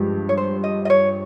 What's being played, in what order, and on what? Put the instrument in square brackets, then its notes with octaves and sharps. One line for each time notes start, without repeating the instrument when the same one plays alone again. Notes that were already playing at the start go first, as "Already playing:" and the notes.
Already playing: [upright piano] G2 F3 G#3 G4
[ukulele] C#5
C5
D#5
D#5
C#5